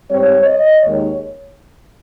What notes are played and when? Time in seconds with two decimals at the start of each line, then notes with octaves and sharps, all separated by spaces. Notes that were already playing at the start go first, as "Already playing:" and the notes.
0.11 G#2 G3 C4 C#5
0.46 D#5
0.82 D#2 D#3 G#3 C#5